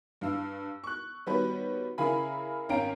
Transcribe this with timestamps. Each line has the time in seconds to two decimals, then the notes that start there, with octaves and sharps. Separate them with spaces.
0.21 G2 F5 E6
0.84 C#6 F#6
1.26 D#3 G3 B3 F#4 B4 C#5
1.98 C#3 E4 A#4 F5 G#5 B5
2.69 G#1 C#4 F5 G5 A#5 D7